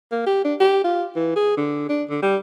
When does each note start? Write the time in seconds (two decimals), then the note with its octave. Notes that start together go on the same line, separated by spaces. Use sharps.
0.12 A#3
0.27 G4
0.45 D4
0.60 G4
0.84 F4
1.16 E3
1.36 G#4
1.57 D3
1.89 D4
2.10 D3
2.22 G3